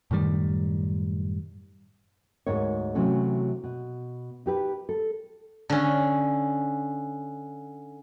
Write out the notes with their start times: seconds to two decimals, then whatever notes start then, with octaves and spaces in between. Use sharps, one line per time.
0.11 F#2 A2 D#3 G3
2.46 D2 G#2 D#4 A#4 C#5
2.95 C3 E3 F#3 A3 C#4
3.64 B2
4.46 D#4 G4 B4
4.89 A4
5.70 D3 C#4